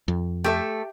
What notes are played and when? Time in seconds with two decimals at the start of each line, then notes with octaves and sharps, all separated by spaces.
0.08 F2
0.44 A3 G4 A4 E5